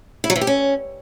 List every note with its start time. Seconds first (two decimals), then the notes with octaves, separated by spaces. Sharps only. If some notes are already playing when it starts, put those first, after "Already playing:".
0.24 E4
0.30 F#3
0.36 E3
0.41 G4
0.47 C#4